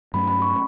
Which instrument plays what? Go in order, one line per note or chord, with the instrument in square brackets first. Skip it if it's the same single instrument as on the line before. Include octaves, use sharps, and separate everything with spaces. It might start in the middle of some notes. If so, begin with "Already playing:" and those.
[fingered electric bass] G2 F#3 A3 C#4 [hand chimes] B5
[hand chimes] B5
C#6